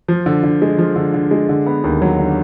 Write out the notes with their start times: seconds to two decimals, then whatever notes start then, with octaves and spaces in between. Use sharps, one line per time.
0.08 F3
0.26 D3
0.44 D3
0.62 G#3
0.78 F3
0.96 D3
1.14 D3
1.31 G#3
1.49 D3
1.66 B3
1.84 D#2
2.02 F#3
2.19 D3